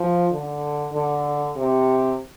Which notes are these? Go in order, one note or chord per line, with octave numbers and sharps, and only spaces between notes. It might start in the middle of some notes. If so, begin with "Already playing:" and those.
Already playing: F3
D3
D3
C3